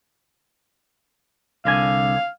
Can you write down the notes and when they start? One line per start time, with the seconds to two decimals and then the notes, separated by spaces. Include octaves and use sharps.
1.65 C2 D3 F5 G#5